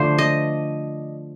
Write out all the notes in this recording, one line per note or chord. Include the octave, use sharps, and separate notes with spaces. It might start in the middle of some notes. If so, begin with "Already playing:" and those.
Already playing: D3 F3 A3 D4 C5
D#5